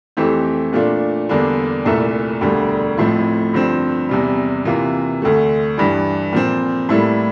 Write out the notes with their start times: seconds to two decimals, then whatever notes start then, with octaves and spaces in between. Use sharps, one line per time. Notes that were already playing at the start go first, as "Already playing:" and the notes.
0.17 F2 E3 A3 C4 G4
0.73 A#2 A3 D4 F4
1.29 E2 D3 G3 A#3 D4
1.85 C2 A#2 A3 E4 A4
2.41 E1 D2 D3 G3
2.97 A1 A2 F3 C4 E4
3.53 G1 G2 F3 C4
4.09 E2 C3 G3
4.65 C3 E3 A#3 F4
5.22 D2 D3 A3
5.78 G2 E3 G3
6.33 A#2 F3 C4
6.89 A2 G3 A#3 E4 A4